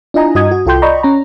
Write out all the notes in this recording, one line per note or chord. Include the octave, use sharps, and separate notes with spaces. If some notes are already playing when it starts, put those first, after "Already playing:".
D4 E4 F4 D#5 G#5 A#5
G2 F#4 D#5 D#6 G#6
F#4
C2 F4 A4 G5 C6 G6
D5 D#5 A#5 B5 C#6
C#4 A#5